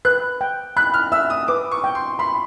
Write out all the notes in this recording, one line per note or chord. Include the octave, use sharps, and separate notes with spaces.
B4 F#6
G5
B5 F#6
F6
E5 E6
D#6
B4 D6
C#6
G5
C6
B5 C6